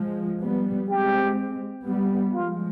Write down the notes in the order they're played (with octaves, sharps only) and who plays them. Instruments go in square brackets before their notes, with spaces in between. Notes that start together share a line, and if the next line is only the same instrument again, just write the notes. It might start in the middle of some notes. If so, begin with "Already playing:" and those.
Already playing: [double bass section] F3 G#3
G3 B3
[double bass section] G#3 C4 [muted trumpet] G4
[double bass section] G3 B3
[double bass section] F3 G#3 [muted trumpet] F4